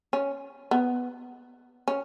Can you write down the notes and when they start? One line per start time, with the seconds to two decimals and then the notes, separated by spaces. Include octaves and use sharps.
0.13 C#4
0.71 B3
1.88 C#4